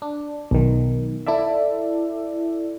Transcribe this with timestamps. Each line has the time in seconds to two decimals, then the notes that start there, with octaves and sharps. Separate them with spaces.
0.02 D4
0.51 B1 D#3
1.26 E4 A4 D5 E5